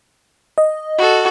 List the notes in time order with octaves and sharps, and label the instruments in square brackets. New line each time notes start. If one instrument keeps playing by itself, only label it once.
[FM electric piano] D#5
[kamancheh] F#4 A4